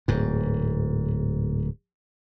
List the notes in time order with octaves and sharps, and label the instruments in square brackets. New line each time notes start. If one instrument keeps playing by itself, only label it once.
[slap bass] D1 G#2